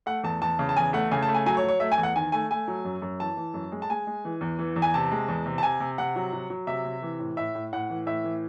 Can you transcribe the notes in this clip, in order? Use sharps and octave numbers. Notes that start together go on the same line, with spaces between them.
A3 F#5
E2 A5
E2 A5
C#3
A5
E2 G#5
A3 F#5
C#3 G#5
A5
A3
G#5
F#3 G#5
C#5
F#3
C#5
A3 E5
G#5
E2
F#5
D#3 G#5
A3 G#5
A3 G#5
F#3
F#2
F#2
E3 A5
E3
F#2
G#3
A5
G#3 G#5
G#3
E3
E2
E3
E2
G#5
C3 A5
G#3
E2
C3
A5
C3 G#5
C3
C3 F#5
F#3
F#3
F#3
C3 E5
C3
E3
A2
A2 E5
A2
A2 F#5
E3
A2 E5
E3